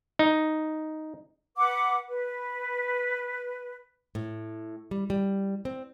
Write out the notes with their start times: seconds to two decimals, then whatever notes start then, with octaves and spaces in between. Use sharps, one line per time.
0.19 D#4
1.56 B4 F#5 D6
2.08 B4
4.15 A2
4.91 G3
5.10 G3
5.65 C4